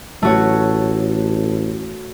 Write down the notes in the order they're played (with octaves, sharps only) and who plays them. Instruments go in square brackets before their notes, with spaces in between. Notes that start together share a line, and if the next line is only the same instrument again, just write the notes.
[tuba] A1 [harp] A3 F#4 C#5